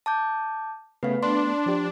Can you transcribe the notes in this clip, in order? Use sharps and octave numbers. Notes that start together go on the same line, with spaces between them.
A5 D6 G6
C#3 A3 B3 B4 F5
D4 C6
F3 G4